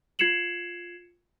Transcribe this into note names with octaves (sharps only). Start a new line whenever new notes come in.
F4 G#6 C7 C#7 E7 F#7